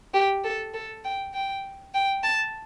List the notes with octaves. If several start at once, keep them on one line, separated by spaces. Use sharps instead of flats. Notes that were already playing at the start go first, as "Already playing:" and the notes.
G4
A4
A4
G5
G5
G5
A5